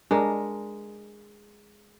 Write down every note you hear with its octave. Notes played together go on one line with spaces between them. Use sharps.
G#3 D4 A#4